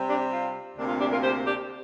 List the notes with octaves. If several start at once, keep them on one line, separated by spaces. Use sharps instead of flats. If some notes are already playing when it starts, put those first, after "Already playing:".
Already playing: C3 G3 C4
D4 G4
F4
D2 C3 A#3 D4
F4
D4 G4
F4 A#4
G4 C5
D4 G4